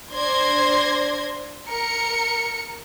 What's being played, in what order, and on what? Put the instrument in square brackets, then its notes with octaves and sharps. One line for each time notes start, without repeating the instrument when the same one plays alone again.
[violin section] D4 C5 D5 C6 G#6 A#6
A#4 C#7